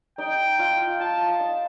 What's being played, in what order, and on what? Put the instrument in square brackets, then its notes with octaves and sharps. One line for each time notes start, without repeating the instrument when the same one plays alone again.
[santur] D#4 [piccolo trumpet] G5
[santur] F4
[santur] F4 [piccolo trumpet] A5
[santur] D#4